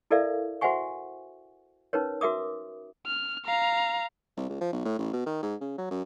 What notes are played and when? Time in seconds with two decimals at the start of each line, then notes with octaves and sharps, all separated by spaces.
0.11 E4 A4 A#4 D5 E5 F5
0.61 F#4 C5 E5 F#5 G#5 C#6
1.93 C#4 D#4 A#4 B4 C#5
2.21 F#4 A#4 E5 D6 D#6
3.06 F6
3.45 F5 A#5
4.37 C2
4.49 C#2
4.61 F3
4.72 B1
4.85 A2
4.98 A1
5.13 B2
5.26 D#3
5.43 G#2
5.61 C#3
5.78 F#3
5.91 F#2